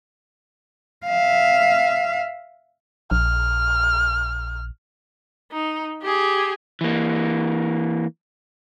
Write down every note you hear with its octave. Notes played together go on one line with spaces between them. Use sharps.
E5 F5
A#1 F6
D#4
G4 G#4
E3 A#3